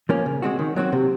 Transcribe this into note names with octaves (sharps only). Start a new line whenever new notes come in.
F3 A#3 C#4
C#3
G#3 C4 F#4
D#3
F#3 C4 F#4
C3